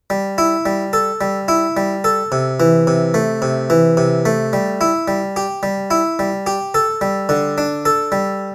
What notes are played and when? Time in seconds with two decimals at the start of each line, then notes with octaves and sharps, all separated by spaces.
0.10 G3
0.38 E4
0.66 G3
0.93 A4
1.21 G3
1.48 E4
1.77 G3
2.04 A4
2.32 C3
2.60 E3
2.87 C3
3.14 A3
3.42 C3
3.70 E3
3.97 C3
4.25 A3
4.53 G3
4.81 E4
5.08 G3
5.36 G4
5.63 G3
5.91 E4
6.19 G3
6.47 G4
6.74 A4
7.01 G3
7.29 D3
7.58 D4
7.85 A4
8.12 G3